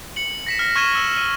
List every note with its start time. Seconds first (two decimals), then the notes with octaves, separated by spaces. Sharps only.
0.16 C#7 F#7
0.46 A#6 B6 E7
0.59 F6 A#6 C7
0.76 C#6 F6 G#6 D#7 E7 G7
0.95 E6
1.17 D#7